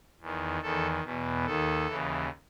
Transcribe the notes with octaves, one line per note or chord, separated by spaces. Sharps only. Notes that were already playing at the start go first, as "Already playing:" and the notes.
E2 D#3
E2 D#3 A4
E2 B2
D#2 D#3 A4
D#2 C#3 E3